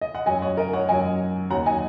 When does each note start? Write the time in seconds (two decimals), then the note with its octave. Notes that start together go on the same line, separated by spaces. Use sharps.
0.01 D#5
0.15 F#5
0.26 F#2 F#3 D#5 G#5
0.42 C#5 F#5
0.57 A#4 D#5
0.73 C#5 F#5
0.89 F#2 F#3 D#5 G#5
1.50 D#2 D#3 F#3 F#5 A#5
1.66 D#5 G#5